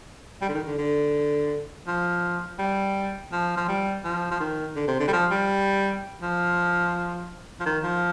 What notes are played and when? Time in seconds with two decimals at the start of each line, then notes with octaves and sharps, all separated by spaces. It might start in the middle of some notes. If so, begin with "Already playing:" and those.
0.41 G3
0.49 D3
0.53 D#3
0.66 D3
0.78 D3
1.87 F3
2.59 G3
3.32 F3
3.57 F3
3.68 G3
4.04 F3
4.31 F3
4.40 D#3
4.76 D3
4.88 C3
5.00 D3
5.08 G3
5.13 F3
5.31 G3
6.22 F3
7.60 F3
7.66 D#3
7.83 F3